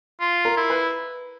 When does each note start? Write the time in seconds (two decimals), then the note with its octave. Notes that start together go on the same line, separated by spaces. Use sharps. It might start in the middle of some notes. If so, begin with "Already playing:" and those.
0.21 F4
0.45 A#4
0.57 E4
0.70 B4